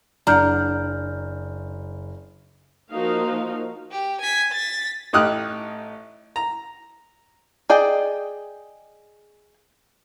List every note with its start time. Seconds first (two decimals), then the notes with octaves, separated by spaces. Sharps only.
0.27 F#1 D4 D5 F#5 A#5 F6 G6
2.91 F3 A#3 D#4 F#4 F5
3.91 G4
4.21 G#5 B6
4.52 A6 B6
5.13 A1 D#4 G4 D#6 F6 F#6
6.36 A#5
7.70 G#4 D5 D#5 G5